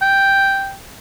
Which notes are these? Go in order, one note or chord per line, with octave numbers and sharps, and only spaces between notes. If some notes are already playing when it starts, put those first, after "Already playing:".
G5